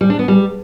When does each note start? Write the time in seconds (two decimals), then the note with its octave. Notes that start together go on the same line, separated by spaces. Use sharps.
0.01 G3
0.10 D4
0.19 B3
0.28 G3